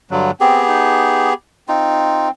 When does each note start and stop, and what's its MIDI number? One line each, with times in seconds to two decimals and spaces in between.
0.11 0.31 43
0.11 0.31 50
0.11 0.31 54
0.41 1.34 59
0.41 0.63 60
0.41 1.34 67
0.41 1.34 68
0.68 1.30 63
1.68 2.31 60
1.68 2.29 63
1.68 2.29 65